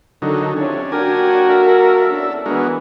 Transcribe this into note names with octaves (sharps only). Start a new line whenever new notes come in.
D3 D#3 F#3 D#4 A4
C3 C#4 D4 F4 C#5
F#3 A#3 D4 F#4 G4 A#4 G#5
A4 E5
E2 C#4 D4
E3 G#3 B3 D4 F#4 A#4